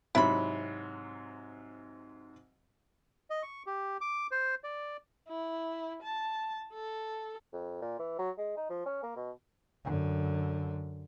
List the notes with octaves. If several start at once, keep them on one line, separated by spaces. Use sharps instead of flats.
G#2 C3 F#3 E4 B5
D#5
C#6
G4
D6
C5
D5
E4
A5
A4
F2
A#2
E3
F#3
G#3
D#4
F3
C#4
A#3
B2
F#2 D3